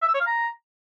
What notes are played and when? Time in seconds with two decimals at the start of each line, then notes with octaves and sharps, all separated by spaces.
0.02 E5
0.08 E6
0.14 C#5
0.20 F5
0.27 A#5